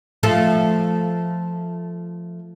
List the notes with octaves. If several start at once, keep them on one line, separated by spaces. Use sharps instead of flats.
F3 A3 A4